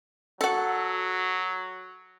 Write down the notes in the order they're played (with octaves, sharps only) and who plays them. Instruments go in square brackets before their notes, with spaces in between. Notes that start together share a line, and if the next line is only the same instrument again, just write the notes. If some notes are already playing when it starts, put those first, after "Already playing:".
[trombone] F#3 [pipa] F#4 A4